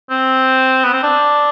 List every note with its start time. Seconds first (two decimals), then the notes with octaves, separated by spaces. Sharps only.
0.10 C4
0.85 B3
0.93 C4
1.03 D4